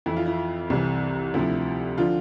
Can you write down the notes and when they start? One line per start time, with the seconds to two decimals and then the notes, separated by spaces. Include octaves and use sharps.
0.06 F2 E3 E4
0.16 F4
0.26 E4
0.70 C2 C3 E3
1.34 D2 C3 F3 E4
1.98 D3 F3 F4